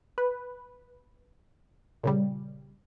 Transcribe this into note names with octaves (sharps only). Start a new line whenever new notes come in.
B4
A#2 C#3 G3